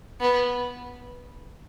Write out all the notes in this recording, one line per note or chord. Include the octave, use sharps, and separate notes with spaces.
B3